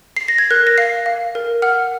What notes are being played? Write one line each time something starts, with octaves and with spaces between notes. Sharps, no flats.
C7
A#6
G#6
A#4 F#6
A#6
F5 C7
F5
A#4
F#5 F6